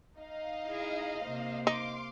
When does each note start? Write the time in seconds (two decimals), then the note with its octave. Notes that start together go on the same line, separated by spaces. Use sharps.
0.18 D#4 D#5 F5
0.67 E4 G#4
1.25 C3 A#3 C5
1.67 D#4 F5 C6 D6